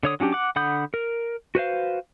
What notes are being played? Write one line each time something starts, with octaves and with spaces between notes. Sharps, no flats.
D3 C#5 D#6
F#3 C#4 D4 G4
F#5 D6
D3 F#5 B5 D#6 G6
A#4
F#4 B4 C5 F5